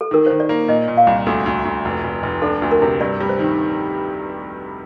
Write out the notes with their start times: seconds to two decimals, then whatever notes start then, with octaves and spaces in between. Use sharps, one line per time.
0.01 A4
0.11 D#3 A#4
0.26 D#3 C5
0.40 D5
0.49 A#3
0.68 A#2 D#5
0.88 A#2
0.97 F5
1.07 C2
1.26 D2 A4
1.46 D2
1.65 D2
1.85 F1
2.04 F1
2.23 F1
2.42 D4 A4
2.62 D2
2.71 A#4
2.82 C3
3.00 G2 D5
3.20 G3
3.29 C5
3.39 D#3